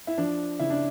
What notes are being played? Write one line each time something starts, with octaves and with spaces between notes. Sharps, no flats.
E4
F3 D4
C#3 E4
D4